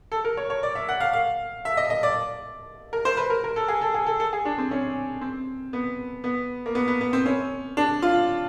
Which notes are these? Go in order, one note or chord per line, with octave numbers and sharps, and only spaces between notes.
A4
A#4
C#5
C#5
D5
E5
F#5
F5
F5
E5
D#5
D#5
D5
A#4
C5
B4
A#4
A#4
A4
G#4
A4
G#4
A4
A4
G#4
D4
C4
C#4
C4
B3
B3
A#3
B3
B3
B3
C4
C#4
D4
F4